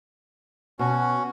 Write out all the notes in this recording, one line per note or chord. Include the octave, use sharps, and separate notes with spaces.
B2 C#4 F#4